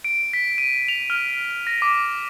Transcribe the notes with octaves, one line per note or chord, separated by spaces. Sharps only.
D7
B6
D#7
F7
F6
A#6
D6